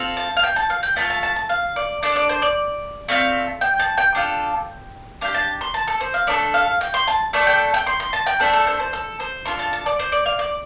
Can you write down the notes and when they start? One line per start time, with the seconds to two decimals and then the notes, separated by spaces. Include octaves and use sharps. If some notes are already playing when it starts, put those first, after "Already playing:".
Already playing: C4 F4 A4
0.17 A5
0.37 F5
0.43 G5
0.56 A5
0.70 F5
0.83 G5
0.96 A3 D4 F4 A5
1.10 A5
1.23 A5
1.36 A5
1.49 F5
1.76 D5
2.03 D4 A4 D5
2.16 D5
2.29 C5
2.42 D5
3.09 A3 C4 F4
3.61 G5
3.80 A5
3.97 G5
4.15 D4 F4 A4
5.21 D4 G4 F5
5.34 A5
5.61 C6
5.74 A5
5.88 A4
6.00 C5
6.14 F5
6.27 A3 D4 A4 D5
6.54 F5
6.81 G5
6.94 C6
7.08 A5
7.33 A3 D4 A4 D5
7.47 G5
7.74 G5
7.87 C6
8.00 C6
8.13 A5
8.26 G5
8.40 A3 D4 A4 C5
8.53 A4
8.67 C5
8.80 C5
8.93 A4
9.20 C5
9.46 D4 F4 A4 C6
9.59 A5
9.73 A5
9.86 D5
9.99 C5
10.12 D5
10.26 F5
10.39 D5